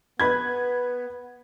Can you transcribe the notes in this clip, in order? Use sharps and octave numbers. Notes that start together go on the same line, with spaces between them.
B3 B4 B5 G#6